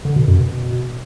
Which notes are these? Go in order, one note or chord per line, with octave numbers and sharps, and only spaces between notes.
D3
B2
F#2
B2